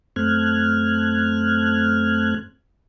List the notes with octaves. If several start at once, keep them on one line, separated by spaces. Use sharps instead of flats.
F#2 A3 C4 F6 F#6 G#6